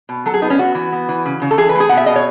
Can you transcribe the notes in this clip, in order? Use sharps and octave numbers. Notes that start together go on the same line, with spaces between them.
B2
F#3 A4
G#4
B3 D#4
C#4
B3 F#4
E3
B3
E3
C#3
C#3
A4
E3 G#4
B4
A3
G#4
B2 F#5
E5
B2 D#5
C#5